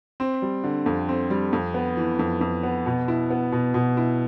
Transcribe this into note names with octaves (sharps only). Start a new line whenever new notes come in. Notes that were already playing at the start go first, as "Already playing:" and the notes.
C4
G3
D3
F2
C4
G3
F2
B3
E3
F2
F2
B3
B2
E4
B3
B2
B2
E4